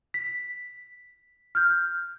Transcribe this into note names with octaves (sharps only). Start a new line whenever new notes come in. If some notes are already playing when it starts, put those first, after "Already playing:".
B6
F6 G6